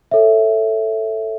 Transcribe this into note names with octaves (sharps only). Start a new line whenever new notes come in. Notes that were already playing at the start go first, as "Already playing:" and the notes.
A4 C#5 E5